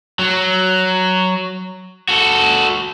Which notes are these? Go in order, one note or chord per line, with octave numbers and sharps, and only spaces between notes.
F#3
F#4 A4